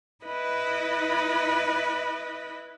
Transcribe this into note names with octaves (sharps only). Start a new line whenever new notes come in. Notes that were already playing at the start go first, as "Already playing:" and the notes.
E4 B4 D#5 B5